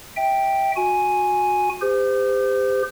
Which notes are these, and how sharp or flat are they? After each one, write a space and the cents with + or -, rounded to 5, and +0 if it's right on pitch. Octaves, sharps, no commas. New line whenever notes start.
E5 -20 G5 +0
F#4 -25 G#5 +0
G4 +35 C5 -30